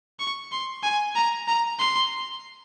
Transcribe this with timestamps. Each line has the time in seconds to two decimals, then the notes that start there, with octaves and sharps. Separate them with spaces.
0.19 C#6
0.52 C6
0.83 G#5
1.15 A#5
1.48 A#5
1.79 C6